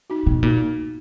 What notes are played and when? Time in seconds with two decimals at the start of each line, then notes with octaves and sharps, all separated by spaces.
0.10 D#4 F#4
0.27 B2 B3
0.43 A#2 D#4 F#4